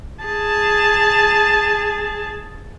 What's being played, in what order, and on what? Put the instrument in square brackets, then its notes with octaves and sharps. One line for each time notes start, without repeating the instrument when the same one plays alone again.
[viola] G#4 A5